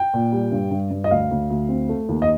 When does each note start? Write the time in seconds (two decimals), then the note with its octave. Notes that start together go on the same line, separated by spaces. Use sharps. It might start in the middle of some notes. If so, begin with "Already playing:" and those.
Already playing: G5
0.14 A#2
0.32 G3
0.52 G2
0.71 G2
0.91 G2
1.04 D#5
1.11 D2 F5
1.31 D2
1.50 D2
1.69 C4
1.89 A3
2.09 D#2
2.22 D#5